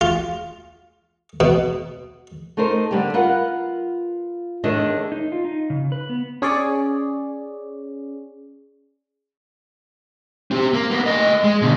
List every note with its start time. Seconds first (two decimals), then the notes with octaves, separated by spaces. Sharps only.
0.01 F4
1.40 B2
2.57 A3 D#4 A#4 C5
2.91 D3 G3 A#3 G4
3.14 F4 A#4 B4 F#5
4.64 E2 A2 D#3 A3 D4 D#5
5.12 D#4
5.32 F4
5.45 D#4
5.70 C#3
5.92 B4
6.09 B3
6.42 C#4 G#4 C#5 D5
10.51 C4 G4
10.74 A#3
10.91 A#3 B3
11.06 A3 D#5
11.44 G#3
11.62 B2 D3